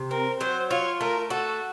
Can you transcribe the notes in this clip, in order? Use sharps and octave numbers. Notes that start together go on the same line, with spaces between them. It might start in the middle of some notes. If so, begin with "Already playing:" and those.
Already playing: C3
C4 A#4
F#3 C5
F4 C#5
A3 A#4
F#4 A4